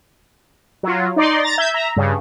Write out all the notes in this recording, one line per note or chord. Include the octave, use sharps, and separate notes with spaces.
F#3 F4
D#4 D5 C6
A#5 A6 A#6
E5 G6 G#6
E5 A#5
G2 C#3